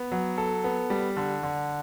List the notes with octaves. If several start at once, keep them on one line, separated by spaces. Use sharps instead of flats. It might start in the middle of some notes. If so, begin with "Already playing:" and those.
Already playing: B3
F#3
A4
B3
G3
D3
D3